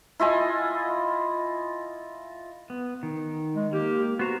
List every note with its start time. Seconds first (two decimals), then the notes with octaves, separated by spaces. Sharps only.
0.19 E4 F4 D#5 G#5
2.70 B3
3.03 D#3
3.56 G#3
3.73 A#3 G4
4.19 B3 F#4 C5 A#5